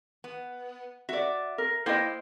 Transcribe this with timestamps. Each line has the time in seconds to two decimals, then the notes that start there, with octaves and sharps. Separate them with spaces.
0.24 B3
1.09 F#4 D5 E5
1.58 A#4
1.86 A#3 E4 C5 D#5 G5